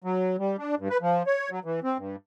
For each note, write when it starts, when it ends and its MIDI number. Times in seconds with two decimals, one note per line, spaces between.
0.04 0.36 54
0.39 0.56 55
0.58 0.75 62
0.79 0.89 43
0.90 0.97 71
1.02 1.23 53
1.27 1.50 73
1.51 1.60 54
1.65 1.80 52
1.83 1.97 60
1.98 2.16 43